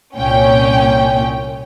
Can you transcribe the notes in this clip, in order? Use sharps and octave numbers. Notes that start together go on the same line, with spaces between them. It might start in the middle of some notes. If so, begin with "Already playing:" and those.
C2 A#2 C#4 G5